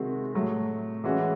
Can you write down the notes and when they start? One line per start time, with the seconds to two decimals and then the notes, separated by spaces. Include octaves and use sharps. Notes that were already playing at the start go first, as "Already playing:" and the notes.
Already playing: C3 D#3 G#3 C4 F#4
0.34 A2 F#3 A3
1.04 E3 G#3 C#4 F#4